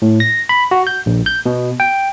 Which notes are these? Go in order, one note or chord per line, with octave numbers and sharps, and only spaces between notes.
A2
A#6
B5
F#4
G6
A#1
G6
B2
G5